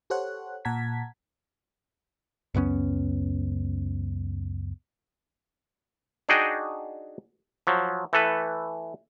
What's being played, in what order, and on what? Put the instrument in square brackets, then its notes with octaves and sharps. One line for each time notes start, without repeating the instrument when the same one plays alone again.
[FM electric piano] G4 A4 C5 C#5 F#5 F#6
A#2 F#5 A5 A#5 G#6 B6
[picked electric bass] C#2 F#2 B3 C#4
[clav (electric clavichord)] D4 D#4 F#4 G#4 D#5 G5
F3 F#3
E3 A3 A4 B4